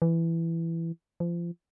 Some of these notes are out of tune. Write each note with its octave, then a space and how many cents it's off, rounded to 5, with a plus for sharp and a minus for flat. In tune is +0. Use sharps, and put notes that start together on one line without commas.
E3 +10
F3 -30